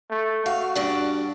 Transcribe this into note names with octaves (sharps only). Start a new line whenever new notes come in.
A3
F#4 F5
G2 D4